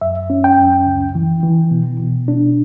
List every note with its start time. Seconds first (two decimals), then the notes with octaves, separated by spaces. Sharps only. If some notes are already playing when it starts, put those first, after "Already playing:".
0.01 F#2 E5
0.30 C#4
0.44 G5
0.58 F#2
0.87 C#2
1.15 E3
1.43 E3
1.71 B2
2.00 B2
2.28 D4